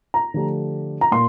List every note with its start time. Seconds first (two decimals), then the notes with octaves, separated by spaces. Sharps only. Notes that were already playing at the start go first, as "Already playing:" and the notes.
0.14 A#5
0.34 D3 F3 A3 D4 G4
1.01 A#5
1.12 A#2 C6